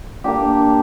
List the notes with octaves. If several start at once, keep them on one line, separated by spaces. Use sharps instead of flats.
A#3 D4 G4